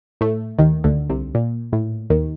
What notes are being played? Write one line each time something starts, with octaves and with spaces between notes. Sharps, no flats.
A2 A3
D#2 D#3
D2 D3
C2 C3
A#2
A2
D#2 D#3